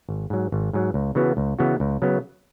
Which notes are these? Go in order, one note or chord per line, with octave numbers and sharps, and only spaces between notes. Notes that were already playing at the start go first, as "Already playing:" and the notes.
G#1
G#2 F#3
G#1
G#2 F#3
C#2
C#3 E3 B3 F#4
C#2
C#3 E3 B3 F#4
C#2
C#3 F#3 B3